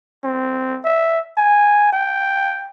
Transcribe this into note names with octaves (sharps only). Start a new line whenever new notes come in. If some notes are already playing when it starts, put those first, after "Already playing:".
C4
E5
G#5
G5